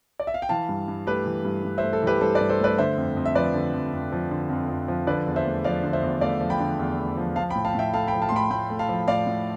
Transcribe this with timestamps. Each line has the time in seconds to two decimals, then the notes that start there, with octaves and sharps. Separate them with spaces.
0.20 D5
0.27 E5
0.34 F5
0.42 G5
0.49 E3 F5 A5
0.69 G2
0.88 G2
1.07 A3 G4 B4
1.26 E3
1.45 G2
1.64 G2
1.78 C5 E5
1.83 A3
1.93 A4
2.02 E3 G4 B4
2.21 G2 A4 C5
2.35 B4 D5
2.40 G2
2.50 A4 C5
2.59 A3 B4 D5
2.78 D3 C5 E5
2.98 F2
3.17 F2
3.26 E5
3.35 F3 B4 D5
3.54 D3
3.74 F2
3.93 F2
4.12 F3
4.31 D3
4.50 F2
4.69 F2
4.88 F3
5.07 D3 B4 D5
5.27 E2
5.36 C5 E5
5.46 A3
5.64 F3 D5 F5
5.84 D3
5.93 C5 E5
6.03 E2
6.21 A3 D5 F5
6.41 F3
6.50 G5 B5
6.60 D3
6.79 E2
6.98 A3
7.17 F3
7.36 F3 F5 A5
7.50 G5 B5
7.55 A2
7.65 F5 A5
7.75 A2 E5 G5
7.93 A3 F5 A5
8.07 G5 B5
8.13 F3
8.22 F5 A5
8.29 C6
8.32 A2 G5 B5
8.51 A2 G5 B5
8.70 A3
8.79 F5 A5
8.89 F3
9.08 A2 D5 F5
9.27 A2